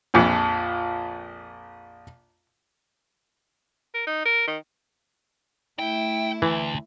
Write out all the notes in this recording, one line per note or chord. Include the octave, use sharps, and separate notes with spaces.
A#1 F2 A#2
A#4
D#4
A#4
D#3
A3 E4 G5
D2 E3